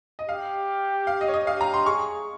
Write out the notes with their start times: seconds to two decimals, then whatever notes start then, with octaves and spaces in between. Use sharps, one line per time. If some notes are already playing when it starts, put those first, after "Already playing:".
0.19 D#5
0.29 G4 F5
1.07 F5
1.21 D#5
1.28 C#5
1.34 D#5
1.47 G4 F5
1.61 A#5
1.74 C6
1.86 G#4 C#6